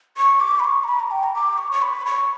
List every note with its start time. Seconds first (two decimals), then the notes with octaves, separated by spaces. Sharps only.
0.17 C#6
0.40 D6
0.60 B5
0.64 C#6
0.84 A#5
0.88 B5
1.00 A#5
1.11 G5
1.23 A#5
1.35 D6
1.58 C#6
1.72 C#6
1.82 B5
2.06 C#6